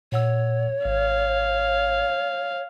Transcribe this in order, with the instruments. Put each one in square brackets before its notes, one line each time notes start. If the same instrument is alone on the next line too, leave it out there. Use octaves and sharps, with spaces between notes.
[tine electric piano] A#2 F#5 E6 [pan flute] C#5
[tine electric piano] G#1 [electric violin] F5